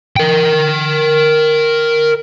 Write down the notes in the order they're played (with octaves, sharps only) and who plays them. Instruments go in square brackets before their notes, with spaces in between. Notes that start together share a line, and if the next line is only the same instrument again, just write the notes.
[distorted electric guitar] A#4 G5